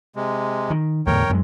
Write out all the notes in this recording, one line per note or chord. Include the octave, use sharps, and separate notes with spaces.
C3 G#3
D#3
E2 A2 D3 A#4 C#5 G5
F#2 G3 G#3